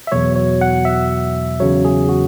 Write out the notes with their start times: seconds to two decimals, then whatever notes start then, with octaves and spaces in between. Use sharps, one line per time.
0.07 E5
0.12 E2 B2 F#3 C#5
0.36 C#5
0.61 F#5
0.85 E5
1.60 E2 C#3 F#3 C#5
1.85 G#4
2.09 F#4